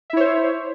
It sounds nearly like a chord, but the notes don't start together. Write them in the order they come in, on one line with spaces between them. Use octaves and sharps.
E5 E4 C#5 C5